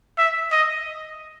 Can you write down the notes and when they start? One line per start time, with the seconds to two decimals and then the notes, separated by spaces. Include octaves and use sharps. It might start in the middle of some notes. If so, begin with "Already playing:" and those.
0.18 E5
0.52 D#5